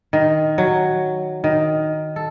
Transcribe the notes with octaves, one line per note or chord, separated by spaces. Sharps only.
D#3
F#3
D#3
A4